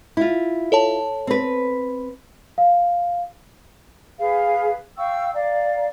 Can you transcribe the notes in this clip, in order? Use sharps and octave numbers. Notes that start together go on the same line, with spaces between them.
E4 F4
A4 C#5 A5
C4 B4
F5
G#4 B4 F5
F5 G5 C#6 E6
D5 F5 A#5